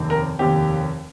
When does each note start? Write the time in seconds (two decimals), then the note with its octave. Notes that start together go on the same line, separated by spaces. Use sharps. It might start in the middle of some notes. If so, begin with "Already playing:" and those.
Already playing: F1 D#2 D#3 C4
0.10 A#4
0.39 F1 D#2 D#3 C4 G4